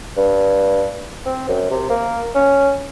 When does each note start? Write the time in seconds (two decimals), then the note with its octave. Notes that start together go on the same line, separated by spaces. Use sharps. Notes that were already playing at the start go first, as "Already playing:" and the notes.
0.17 G2
1.26 C4
1.49 F#2
1.71 C3
1.90 A#3
2.35 C#4